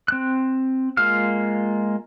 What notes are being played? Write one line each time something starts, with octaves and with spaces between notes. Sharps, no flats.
C4 F#6
G#3 A#3 F4 F5 F6